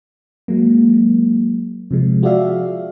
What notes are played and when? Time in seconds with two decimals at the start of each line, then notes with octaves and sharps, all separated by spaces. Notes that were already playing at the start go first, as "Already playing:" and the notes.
0.48 F#3 G#3 A#3
1.91 C3 F3 G#3
2.23 F4 F#4 G#4 D5 E5 F5